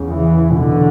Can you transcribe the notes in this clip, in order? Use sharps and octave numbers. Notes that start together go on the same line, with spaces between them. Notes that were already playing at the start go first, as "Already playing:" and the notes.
Already playing: E2 C#3
E3
E2 B2 D3